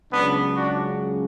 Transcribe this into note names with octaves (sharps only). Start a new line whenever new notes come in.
C#2 C#3 F#3 B3 D4
D4 F#4